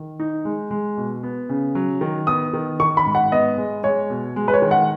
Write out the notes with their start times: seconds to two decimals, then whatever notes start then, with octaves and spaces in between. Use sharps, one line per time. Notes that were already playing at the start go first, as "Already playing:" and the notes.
Already playing: D#3
0.20 D#4
0.45 G#3
0.71 G#3
0.97 B2
1.23 B3
1.49 C#3
1.75 F#3
2.01 D#3
2.27 B3 D#6
2.53 D#3
2.80 D#3 C#6
2.97 B5
3.06 G#2
3.15 F#5
3.32 B3 D#5
3.58 G#3
3.83 G#3 C#5
4.10 B2
4.36 G#3
4.48 B4
4.54 C#5
4.62 D#3
4.71 F#5